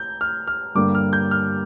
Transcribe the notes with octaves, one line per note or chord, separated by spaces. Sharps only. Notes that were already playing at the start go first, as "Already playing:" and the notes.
Already playing: G6
F6
F6
G2 D3 G3 A#3 D6
F6
G6
F6